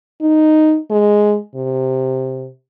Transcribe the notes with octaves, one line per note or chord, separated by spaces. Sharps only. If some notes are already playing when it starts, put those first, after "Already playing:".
D#4
G#3
C3